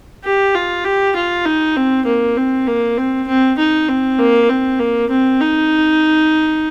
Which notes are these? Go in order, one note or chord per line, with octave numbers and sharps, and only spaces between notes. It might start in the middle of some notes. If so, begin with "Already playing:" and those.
G4
F4
G4
F4
D#4
C4
A#3
C4
A#3
C4
C4
D#4
C4
A#3
C4
A#3
C4
D#4